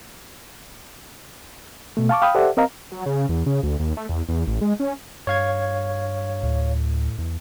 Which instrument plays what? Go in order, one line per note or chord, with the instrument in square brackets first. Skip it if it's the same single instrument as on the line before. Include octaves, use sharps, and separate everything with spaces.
[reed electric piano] B2 A3
F5 A5 C#6 D6
F5 G5 B5 D#6
G4 A4 C5 D5 E5 F#5
C4 A#4 D#5 F5 A#5
[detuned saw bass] F#3
C#3
E2
C#3
D2
D#2
A3
E2
E2
A1
G#3
C#4
[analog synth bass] G2 [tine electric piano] C#5 F5 G#6
[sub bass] D2 [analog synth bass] A2
[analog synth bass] E2